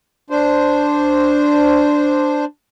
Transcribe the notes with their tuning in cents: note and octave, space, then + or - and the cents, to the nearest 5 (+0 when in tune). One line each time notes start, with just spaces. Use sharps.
D4 +0 C5 -10